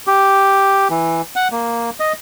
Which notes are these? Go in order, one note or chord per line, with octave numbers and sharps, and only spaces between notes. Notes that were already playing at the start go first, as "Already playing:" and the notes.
G4
E3
F#5
A#3
D#5